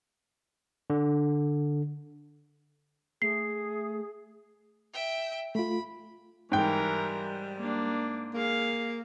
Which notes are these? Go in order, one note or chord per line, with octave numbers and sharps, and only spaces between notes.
D3
A3 G#4 C7
E5 G5
A3 F4 B5
G#2 E3 G3 A#4 G5
A#3 D4
A#3 G#4 F5